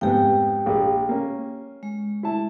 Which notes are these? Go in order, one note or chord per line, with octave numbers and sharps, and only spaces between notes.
F2 G#2 B3 G4 G5
A#1 G#4
A#3 C#4
G#3
E4 A5